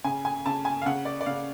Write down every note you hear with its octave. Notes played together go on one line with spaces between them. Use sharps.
C#3 G#5
G#5
C#3 A5
G#5
F5
C#3 F#5
D5
D5
C#3 F5